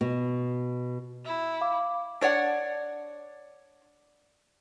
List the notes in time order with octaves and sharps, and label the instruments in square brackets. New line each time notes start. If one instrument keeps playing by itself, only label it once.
[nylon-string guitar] B2
[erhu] E4
[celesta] F5 D6
[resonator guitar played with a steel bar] D4 C#5 D5 F#5